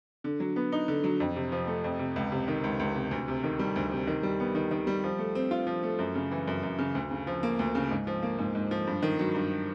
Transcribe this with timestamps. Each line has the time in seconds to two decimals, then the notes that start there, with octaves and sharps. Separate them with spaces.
0.24 D3
0.40 F#3
0.56 B3
0.72 D#4
0.88 D3
1.04 F#3
1.20 F2
1.36 C3
1.52 F3
1.67 A3
1.84 F2
1.99 C3
2.16 C#2
2.32 C3
2.48 D#3
2.64 C#2
2.79 C#2
2.96 C3
3.11 D2
3.28 C3
3.44 D#3
3.59 G3
3.76 D2
3.91 C3
4.07 D#3
4.23 G3
4.40 B3
4.55 D#3
4.71 D#3
4.87 G3
5.04 F3
5.19 A3
5.35 C4
5.51 F4
5.67 F3
5.83 A3
5.99 F#2
6.15 C#3
6.31 E3
6.48 F#2
6.63 F#2
6.79 C#3
6.95 D2
7.11 C#3
7.27 F3
7.43 A#3
7.59 D2
7.75 C#3
7.91 G#2
8.07 F3
8.23 A#3
8.38 G#2
8.55 G#2
8.71 F3
8.87 G2
9.02 D#3
9.19 F#3
9.34 G2